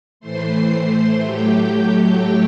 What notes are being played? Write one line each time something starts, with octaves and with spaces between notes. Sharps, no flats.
A2 E3 A3 C5 C6
A2 F#3 A3 G4 G5